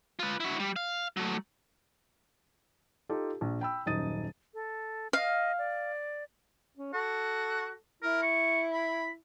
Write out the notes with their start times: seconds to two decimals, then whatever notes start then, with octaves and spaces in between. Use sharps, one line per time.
0.19 F4 B4
0.40 E4 F#4
0.60 G3
0.76 F5
1.17 F#3 A3
3.09 D#4 F4 G4 A4
3.41 A#1
3.61 G5 B5 E6
3.86 D#1 F#2 D#4 D#6 A6 D#7
4.54 A4
5.13 D#5 F5
5.58 D5
6.77 C#4
6.94 F#4 A4
8.02 E4 A#4
8.22 C#6
8.73 B5